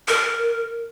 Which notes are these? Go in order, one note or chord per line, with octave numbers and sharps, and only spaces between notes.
A#4